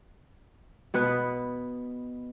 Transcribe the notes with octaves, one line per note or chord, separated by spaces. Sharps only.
B2 B3 B4